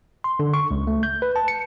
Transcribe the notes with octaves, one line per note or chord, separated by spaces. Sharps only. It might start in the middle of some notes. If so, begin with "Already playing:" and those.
C6
D3
C#6
C#2
A3
G6
B4
A5
C#7